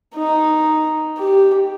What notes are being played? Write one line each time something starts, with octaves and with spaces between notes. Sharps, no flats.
D#4
G4